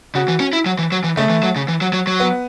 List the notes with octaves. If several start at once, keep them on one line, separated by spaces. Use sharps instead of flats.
C#3 F#4
E3
C#4
E4
F#3
E3
F#3
E3
C#3 A3
E3
F#3
C#3
E3
F#3
F#3
F#3
B3